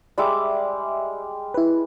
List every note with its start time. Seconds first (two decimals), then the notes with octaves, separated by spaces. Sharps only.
0.18 G3 G#3 D5 E5 D6
1.54 E4 B4